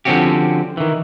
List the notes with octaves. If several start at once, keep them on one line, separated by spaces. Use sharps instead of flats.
D3 F3 C4 C#4 F#4 G4
D#3 E3